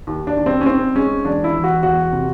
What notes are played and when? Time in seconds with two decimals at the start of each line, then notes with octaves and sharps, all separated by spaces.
0.07 D#2
0.27 D4
0.37 D#2
0.46 C4
0.61 C#4
0.66 D#3 C4
0.96 G#3 C#4
1.25 E1 D4
1.44 E4
1.54 E3
1.64 F#4
1.83 E2 F#4
2.13 C3